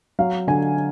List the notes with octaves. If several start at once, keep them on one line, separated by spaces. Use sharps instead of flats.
F#3 F5
D3 G#5